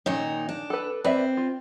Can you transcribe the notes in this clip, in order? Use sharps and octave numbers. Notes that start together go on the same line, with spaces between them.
A#2 D#3 C#4 D#4
D4
A4 B4
C4 B4 D5 E5
F4